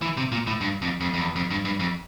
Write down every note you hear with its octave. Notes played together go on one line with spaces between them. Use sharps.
E3
C3
A#2
A2
G2
F2
F2
F2
E2
F2
G2
G2
F2